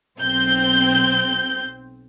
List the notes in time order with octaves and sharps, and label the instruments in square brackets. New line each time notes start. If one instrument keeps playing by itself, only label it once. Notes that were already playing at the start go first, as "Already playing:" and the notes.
[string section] B1 C4 G6